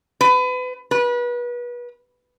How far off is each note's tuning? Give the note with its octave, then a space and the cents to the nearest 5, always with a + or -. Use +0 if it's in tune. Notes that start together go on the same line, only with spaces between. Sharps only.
B4 +30
B4 -30